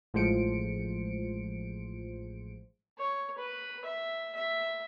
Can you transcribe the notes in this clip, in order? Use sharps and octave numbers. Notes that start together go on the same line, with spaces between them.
A1 F3 G#3 C5 C#7 D7
C#5
B4
E5
E5